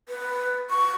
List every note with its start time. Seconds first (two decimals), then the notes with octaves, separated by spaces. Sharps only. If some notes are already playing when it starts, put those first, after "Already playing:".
0.09 B4
0.70 C#6